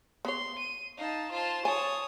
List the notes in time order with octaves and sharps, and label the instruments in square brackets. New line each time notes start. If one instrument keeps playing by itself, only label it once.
[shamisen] B3 C#5 [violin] C6
[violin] D#7
[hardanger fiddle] D#4 [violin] F5 A5
[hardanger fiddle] F4 [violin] C5 A5
[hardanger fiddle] C#5 D#6 [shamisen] G#5